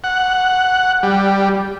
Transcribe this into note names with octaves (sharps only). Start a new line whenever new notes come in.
F#5
G3